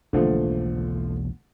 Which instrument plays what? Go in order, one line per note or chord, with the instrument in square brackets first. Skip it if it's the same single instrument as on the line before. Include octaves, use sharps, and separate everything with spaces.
[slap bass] E1 B1 A#3 [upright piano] D3 F3 A3